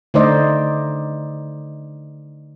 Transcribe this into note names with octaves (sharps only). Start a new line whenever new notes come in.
D3 A3 D#4 C5 D5 D#5